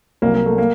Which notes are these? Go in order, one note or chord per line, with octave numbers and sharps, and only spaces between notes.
C2 C3 F#3 A#3
A#3
A3
A#3